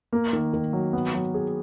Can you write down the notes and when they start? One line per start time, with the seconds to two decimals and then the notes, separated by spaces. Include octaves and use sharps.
0.13 A#3
0.33 D#3
0.53 D#3
0.73 F#3
0.93 B3
1.14 F#3
1.34 G#4